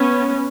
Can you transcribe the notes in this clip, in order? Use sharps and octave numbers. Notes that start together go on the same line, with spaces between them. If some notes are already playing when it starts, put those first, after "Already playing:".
Already playing: B3 C#4